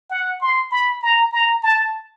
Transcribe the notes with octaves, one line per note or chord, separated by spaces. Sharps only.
F#5
C6
B5
A#5
A#5
A5